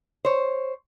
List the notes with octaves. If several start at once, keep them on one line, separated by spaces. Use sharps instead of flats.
C5 C#5